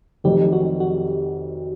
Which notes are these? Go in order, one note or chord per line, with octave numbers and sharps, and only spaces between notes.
F1 F2 C3 D#3 F#3 G4
F#4
F#4